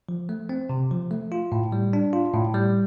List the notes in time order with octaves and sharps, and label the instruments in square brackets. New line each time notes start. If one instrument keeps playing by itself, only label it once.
[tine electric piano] F3
A3
C4
C3
F3
A3
F4
A2
G3
D4
F4
A2
G3